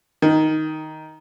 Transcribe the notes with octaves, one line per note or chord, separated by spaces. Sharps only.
D#3